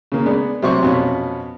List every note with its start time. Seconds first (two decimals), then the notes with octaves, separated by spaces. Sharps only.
0.12 C#3 A#3
0.25 G#3 B3 D4
0.62 C3 F#3 C5 D5 C#6
0.83 F2 B2 B3 C#4